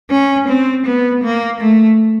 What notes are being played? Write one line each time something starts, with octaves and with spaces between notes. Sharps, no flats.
C#4
C4
B3
A#3
A3